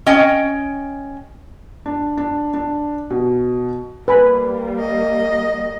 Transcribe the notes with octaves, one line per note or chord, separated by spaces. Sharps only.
C#4 D#5 G5
D4
D4
D4
B2
G3 A#3 B4 G#5 B5
D#5